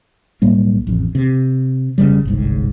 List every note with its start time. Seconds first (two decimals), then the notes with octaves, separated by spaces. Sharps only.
0.42 B1 A2 G3 A#3
0.87 A1 F2
1.15 C3
1.98 F1 C#3 G3
2.25 G1 C2 G#2